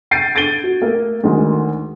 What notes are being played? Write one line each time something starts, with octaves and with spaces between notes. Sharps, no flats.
G6 A6 C7 D7 D#7
G#6 A6 D7 D#7 G7
F#4
A3 A#3
D2 D#3 G#3